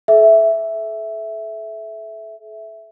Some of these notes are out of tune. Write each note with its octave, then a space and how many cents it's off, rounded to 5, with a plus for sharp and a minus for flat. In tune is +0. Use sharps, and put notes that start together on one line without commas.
A4 -40 E5 +0